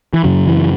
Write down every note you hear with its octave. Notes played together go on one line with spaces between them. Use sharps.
E3
F#2 C#3 F#3
E3